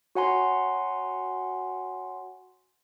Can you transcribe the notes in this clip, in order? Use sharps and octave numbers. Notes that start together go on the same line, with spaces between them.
F#4 C#5 F#5 G#5 A#5 C6